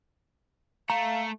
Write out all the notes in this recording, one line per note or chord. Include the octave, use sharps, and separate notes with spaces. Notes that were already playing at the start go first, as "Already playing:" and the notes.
A3 F5 A#5